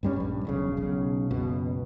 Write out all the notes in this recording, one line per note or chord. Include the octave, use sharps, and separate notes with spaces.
G2 G3 C#4
A#1 G2
E1 B1 C#3
B1 C#3
F#1 C#2 B2